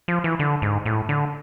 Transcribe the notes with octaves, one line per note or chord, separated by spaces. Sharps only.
F3
E3
D3
G#2
A2
D3